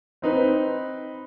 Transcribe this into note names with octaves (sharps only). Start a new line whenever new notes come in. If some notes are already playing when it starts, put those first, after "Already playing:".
C4 D#4 B4